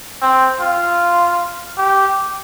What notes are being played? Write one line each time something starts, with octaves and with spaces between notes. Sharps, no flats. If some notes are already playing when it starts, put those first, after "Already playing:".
C4
F4
G4